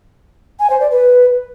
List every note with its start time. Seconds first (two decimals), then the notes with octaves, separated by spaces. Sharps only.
0.59 G#5
0.69 C5
0.80 D5
0.90 B4